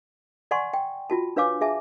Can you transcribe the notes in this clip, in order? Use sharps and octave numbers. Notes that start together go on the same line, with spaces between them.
D5 F#5 G#5 C6 C#6
G5
F4 F#4 A5
D4 B4 C#5 F5 G#5 D6
G#4 E5 G#5 A5